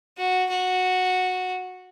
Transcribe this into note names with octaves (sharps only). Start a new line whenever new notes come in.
F#4
F#4